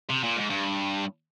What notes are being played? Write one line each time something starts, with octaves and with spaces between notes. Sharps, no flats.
C3
A#2
G#2
G2